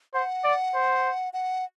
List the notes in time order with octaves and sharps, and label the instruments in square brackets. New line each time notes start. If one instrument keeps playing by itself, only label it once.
[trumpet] C5 [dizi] F#5
[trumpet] D5
C5
[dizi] F#5